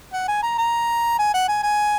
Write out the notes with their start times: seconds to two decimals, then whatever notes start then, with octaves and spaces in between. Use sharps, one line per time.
0.13 F#5
0.28 G#5
0.43 A#5
0.58 A#5
1.19 G#5
1.34 F#5
1.48 G#5
1.63 G#5